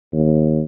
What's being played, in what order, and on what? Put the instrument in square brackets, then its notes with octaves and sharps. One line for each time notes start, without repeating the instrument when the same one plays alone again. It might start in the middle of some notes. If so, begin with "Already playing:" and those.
[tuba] D#2